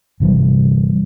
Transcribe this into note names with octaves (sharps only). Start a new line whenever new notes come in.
G1 C3 E3 G3